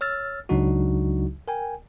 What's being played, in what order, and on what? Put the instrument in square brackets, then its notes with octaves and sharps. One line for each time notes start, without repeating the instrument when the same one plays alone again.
[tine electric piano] C#5 E6 F6 A6
C#2 C#3 F#3 D4 D#4 F#4
A#4 G5 G#5